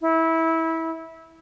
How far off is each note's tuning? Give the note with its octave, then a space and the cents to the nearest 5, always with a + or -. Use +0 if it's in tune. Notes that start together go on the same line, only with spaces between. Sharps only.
E4 -20